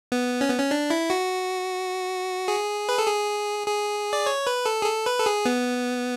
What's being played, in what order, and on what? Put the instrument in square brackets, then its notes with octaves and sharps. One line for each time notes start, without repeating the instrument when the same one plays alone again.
[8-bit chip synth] B3
C#4
B3
C#4
D4
E4
F#4
G#4
B4
A4
G#4
G#4
D5
C#5
B4
A4
G#4
A4
B4
A4
G#4
B3